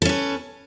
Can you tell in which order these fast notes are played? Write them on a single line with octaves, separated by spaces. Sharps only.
A4 C#4 B4